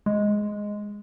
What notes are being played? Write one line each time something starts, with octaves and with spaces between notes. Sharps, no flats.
G#3